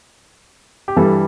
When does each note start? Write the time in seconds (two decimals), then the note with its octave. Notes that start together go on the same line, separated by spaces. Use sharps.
0.88 G4
0.97 G2 E3 G3 A4